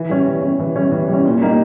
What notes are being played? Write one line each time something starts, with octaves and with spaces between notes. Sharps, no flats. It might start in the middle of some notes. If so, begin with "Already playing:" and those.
Already playing: E3
G3 C#4
E3
G3 C#4
E3
G3 C#4
E3
G3 C#4
A#2
G3 A#3 D#4